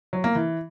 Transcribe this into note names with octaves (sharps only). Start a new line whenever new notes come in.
F#3
A#3
E3